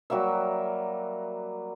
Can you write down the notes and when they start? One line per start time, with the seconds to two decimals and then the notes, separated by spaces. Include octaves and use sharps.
0.10 F#3 G3 A#3 E5